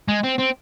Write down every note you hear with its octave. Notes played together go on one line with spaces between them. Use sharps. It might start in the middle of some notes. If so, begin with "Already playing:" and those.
G#3
C4
C4